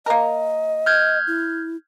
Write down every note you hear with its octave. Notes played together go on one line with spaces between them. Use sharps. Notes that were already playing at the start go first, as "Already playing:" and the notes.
A#3 A#4 D#5
F6 G6 G#6
E4